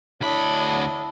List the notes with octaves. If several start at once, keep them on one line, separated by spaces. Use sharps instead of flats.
D2 D4 E4 A4 C#5 D#5 B5